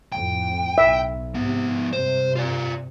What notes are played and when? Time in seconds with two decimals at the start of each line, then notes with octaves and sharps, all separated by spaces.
0.12 F2 A2 G5
0.78 B1 E5
1.35 G#2 C3 F3 B3
1.93 G2 C3 C5
2.36 F4 D5